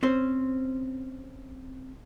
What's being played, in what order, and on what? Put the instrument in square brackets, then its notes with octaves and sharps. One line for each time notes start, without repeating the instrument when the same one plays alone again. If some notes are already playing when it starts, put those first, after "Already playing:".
[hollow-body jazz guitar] C4 C#4 C5